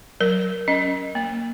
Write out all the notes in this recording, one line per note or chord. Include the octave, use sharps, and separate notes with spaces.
F#3 A#4
C#4 D#5
A#3